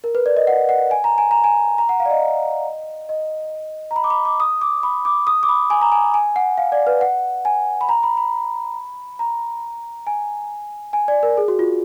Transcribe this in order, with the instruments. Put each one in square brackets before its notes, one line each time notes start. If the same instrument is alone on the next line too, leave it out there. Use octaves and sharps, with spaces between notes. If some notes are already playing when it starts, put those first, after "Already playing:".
[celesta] A#4
B4
D5
D#5
F#5
F#5
G#5
A#5
G#5
A#5
G#5
A#5
F#5
F5
D5
D#5
D#5
A#5
B5
D6
B5
D6
D#6
D6
B5
D6
D#6
D6
B5
G#5
A#5
G#5
G#5
F#5
F5
D5
B4
F#5
G#5
B5
A#5
B5
B5
A#5
G#5
G#5
D5
A#4
G#4
F#4
F4